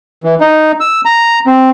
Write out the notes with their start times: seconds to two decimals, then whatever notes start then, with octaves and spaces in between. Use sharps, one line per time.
0.24 E3
0.41 D#4
0.80 E6
1.05 A#5
1.47 C4